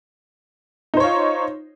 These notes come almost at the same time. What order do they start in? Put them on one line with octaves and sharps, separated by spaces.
D#4 C5 C#5 F4